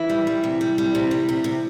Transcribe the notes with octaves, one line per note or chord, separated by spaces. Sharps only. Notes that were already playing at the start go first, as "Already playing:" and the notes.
Already playing: E3 E4
G3
G3
C3
G3
G3
C3
G3
C3
C3